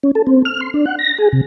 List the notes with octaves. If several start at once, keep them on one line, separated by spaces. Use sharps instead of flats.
C#4
A4
C4
F6
C6
D4
F#5
A#6
G#4
C3